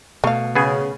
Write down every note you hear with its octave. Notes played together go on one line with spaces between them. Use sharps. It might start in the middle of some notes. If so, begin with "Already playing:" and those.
B2 A3 F5
C#3 B3 G#4